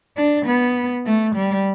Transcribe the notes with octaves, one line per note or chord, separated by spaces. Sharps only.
D4
B3
A3
G3